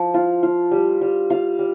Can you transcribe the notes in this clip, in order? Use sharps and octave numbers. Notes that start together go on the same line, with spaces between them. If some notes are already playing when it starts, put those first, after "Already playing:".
Already playing: F3
F4
F4
G3
G3
F4 F5
G3